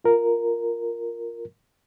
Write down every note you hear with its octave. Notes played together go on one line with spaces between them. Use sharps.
F4 A#4